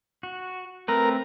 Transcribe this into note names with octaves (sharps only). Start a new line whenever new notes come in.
F#4
A3 C4 A#4 B4